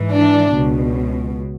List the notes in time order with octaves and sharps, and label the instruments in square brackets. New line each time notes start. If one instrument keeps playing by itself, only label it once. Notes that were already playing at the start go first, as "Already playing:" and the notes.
Already playing: [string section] G#2 E3
D4
C#2 B2